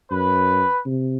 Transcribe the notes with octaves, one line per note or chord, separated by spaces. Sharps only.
F#2 B4
C3